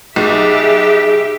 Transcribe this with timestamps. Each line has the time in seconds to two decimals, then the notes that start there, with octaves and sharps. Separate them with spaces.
0.16 B1 G4 G#4 E5